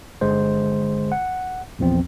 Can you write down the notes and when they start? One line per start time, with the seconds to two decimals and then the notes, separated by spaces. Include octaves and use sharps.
0.21 G1 D3 G#3 C5
1.12 F#5
1.79 A#1 E2 F3 C4